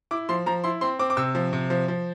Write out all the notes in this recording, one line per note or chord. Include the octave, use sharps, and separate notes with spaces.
E4 D6
F3 C6
F3 A#5
E4 C6
C4 C6
C4 D6
D6
C3 E6
F3
C3
F3
F3